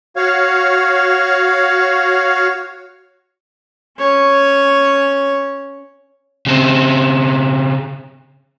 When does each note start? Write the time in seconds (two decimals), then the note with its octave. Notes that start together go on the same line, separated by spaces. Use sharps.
0.16 F#4 C#5 F5
3.99 C#4 C#5
6.46 C#3 C4